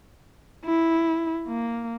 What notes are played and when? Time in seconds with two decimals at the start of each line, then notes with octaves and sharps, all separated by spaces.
0.65 E4
1.48 A#3